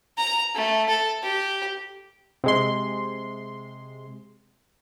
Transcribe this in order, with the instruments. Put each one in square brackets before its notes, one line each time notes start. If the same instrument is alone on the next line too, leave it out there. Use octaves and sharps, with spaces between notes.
[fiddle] A#5
A3
A4
G4
[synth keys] C3 G#3 C6